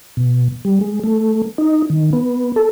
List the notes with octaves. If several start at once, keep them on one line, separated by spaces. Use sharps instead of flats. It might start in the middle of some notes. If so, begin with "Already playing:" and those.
B2
G3
G#3
A3
D#4
D#3
B3
A4